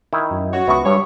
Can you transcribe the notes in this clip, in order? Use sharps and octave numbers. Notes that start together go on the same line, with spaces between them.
D#3 E4
F#2
F#4 C#5
C#2 B3 E5 C#6
G2 G3 C#5